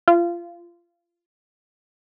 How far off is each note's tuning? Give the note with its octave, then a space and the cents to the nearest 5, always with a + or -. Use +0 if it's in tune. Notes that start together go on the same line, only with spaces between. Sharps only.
F4 -25